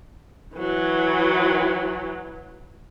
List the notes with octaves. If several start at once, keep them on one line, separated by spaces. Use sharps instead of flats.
E3 F#3